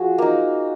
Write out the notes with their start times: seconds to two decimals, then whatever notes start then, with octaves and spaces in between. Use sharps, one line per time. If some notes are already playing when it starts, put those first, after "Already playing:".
Already playing: F3 F#4 G#4
0.18 A#3 D#4